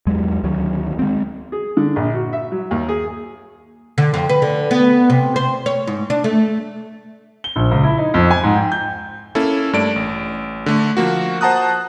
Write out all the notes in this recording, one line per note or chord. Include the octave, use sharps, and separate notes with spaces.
E2 F#3 G#3
D2 D#3 F#3
G#3 C4
G#4
D3
A#1
F#4
E5
F#3
D#2
G#4
D3
F2
B4
D3
B3
C3
C5
C#5
G#2
D4
A3
G7
A#1
C#2
E4
D#4
F2
G#5
G#2
G5
G6
A#3 C#4 E4 A4
G2 A3 A4 D5 D7
A1
D3 A3
F3 A#3 F#4
C5 F#5 A5 A#5 D#6 F#6